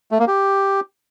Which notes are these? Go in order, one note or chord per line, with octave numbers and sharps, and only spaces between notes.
A3
A#3
G4